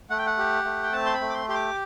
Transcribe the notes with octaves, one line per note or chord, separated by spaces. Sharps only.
A3 F#5
G5
F#5
G4
A3
G5
C4 A5
C6
B5
A3
D6
C6
G4 C6
D6